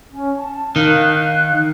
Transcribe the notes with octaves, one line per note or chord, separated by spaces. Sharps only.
C#4
A5
D#3 F5 F#6